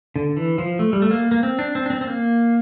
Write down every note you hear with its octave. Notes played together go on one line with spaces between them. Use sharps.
D3
E3
F3
A3
G3
A3
A#3
A#3
C4
D4
C4
D4
C4
C4
A#3